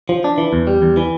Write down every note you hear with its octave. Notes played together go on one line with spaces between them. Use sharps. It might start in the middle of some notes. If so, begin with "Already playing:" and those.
F3
D4
E3
E2
G3
E2
E3